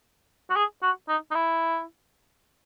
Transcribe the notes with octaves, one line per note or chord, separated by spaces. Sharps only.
F#4
G#4
F#4
D#4
D#4
E4